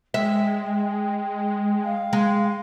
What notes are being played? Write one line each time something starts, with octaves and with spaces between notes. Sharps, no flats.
G#3 E5 G5
F5
G#3